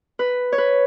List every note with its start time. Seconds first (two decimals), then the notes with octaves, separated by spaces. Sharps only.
0.19 B4
0.52 C#5
0.58 B4